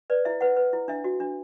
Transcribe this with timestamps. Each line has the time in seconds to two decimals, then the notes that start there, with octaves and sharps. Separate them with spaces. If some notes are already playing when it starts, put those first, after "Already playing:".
0.10 B4 D5
0.25 E4 E5
0.41 B4 F#5
0.56 B4
0.73 E4
0.88 D4 E5
1.04 F#4
1.20 D4